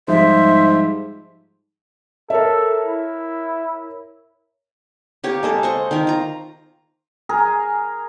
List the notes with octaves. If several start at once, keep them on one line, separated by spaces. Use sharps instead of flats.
G#2 F3 G3 C5 E5
A4 A#4 C#5 E5
E4
A#3 G4 C#5
G#3 A#3 A4
C5 D#5 C#6
D#3 A#4
F4 A#5
G#4 A#4